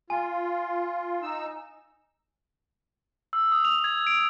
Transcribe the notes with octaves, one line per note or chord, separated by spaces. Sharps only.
F4 G#5
D#4 E6
E6
D#6
F7
G#6
D7